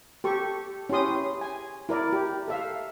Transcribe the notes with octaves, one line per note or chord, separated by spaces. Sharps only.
G4 A4 C#6
C#4 E4 G4 C6 D#6
G#5
E4 A#4 D5
G4
A4 E5 F5